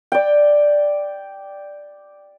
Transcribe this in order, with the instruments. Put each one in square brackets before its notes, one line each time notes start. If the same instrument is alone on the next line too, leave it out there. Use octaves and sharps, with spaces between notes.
[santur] D5 G5